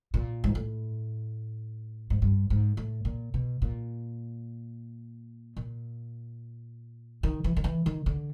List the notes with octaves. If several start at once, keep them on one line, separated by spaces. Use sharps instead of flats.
A#2
G#2
A2
G#2
G2
G#2
A2
A#2
B2
A#2
A#2
D#3
E3
D#3
E3
D#3
D3